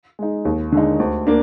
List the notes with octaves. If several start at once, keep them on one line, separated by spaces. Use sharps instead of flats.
G#3 D#4
D#2
D3 G#3 D#4
D2
A#3 D4